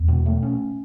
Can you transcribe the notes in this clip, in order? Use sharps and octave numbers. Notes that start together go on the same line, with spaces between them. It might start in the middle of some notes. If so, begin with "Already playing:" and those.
Already playing: E2
B2
A3
C#4